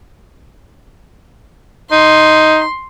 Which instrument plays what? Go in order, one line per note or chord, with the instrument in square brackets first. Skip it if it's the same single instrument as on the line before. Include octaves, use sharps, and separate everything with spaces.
[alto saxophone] D#4 [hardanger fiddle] C6